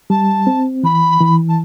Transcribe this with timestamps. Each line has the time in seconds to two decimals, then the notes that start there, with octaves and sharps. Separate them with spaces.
0.10 G3 A5
0.47 C4
0.83 E3 B5
1.20 E3
1.48 A5